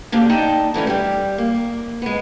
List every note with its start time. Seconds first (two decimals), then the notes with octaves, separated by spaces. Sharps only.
0.12 D3 A#3 D4 G4
0.29 D#4 D5 G5 A5
0.74 D3 E3 A3 C#4
0.87 G3 G4
1.38 A#3
2.02 G#3 B3